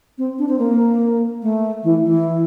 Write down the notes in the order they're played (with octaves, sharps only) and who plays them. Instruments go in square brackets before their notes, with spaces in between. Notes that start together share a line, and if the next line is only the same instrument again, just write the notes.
[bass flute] C4
D4
C4
A#3
A3
E3
E3